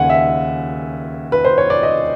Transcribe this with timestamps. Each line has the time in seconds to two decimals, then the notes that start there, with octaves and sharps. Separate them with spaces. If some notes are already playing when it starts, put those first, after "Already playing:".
Already playing: D#2 C#3 F#5 G#5
0.10 E5
1.32 B4
1.45 C5
1.58 C#5
1.70 D5
1.83 D#5